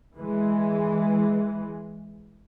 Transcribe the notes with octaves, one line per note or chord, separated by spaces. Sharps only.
E3 G#3